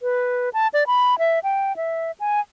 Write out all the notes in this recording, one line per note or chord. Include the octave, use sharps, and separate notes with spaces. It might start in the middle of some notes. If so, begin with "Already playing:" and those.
B4
A5
D5
B5
E5
G5
E5
G#5